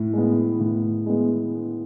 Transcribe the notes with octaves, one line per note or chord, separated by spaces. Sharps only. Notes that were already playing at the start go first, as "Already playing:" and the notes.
Already playing: A2
G#3 B3
A2
G#3 B3